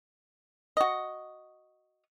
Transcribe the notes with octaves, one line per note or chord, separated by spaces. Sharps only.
F#4 D#5